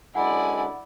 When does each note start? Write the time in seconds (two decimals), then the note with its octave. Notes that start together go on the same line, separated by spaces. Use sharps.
0.15 F#2 D3 G#3 E4 D5 F#5 G#5